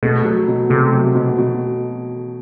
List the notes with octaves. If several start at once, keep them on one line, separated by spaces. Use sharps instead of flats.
B2 A3
F#3
B2
C3 A3
F#3
B2
B2